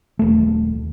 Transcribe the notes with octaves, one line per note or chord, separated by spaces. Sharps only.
D#1 A3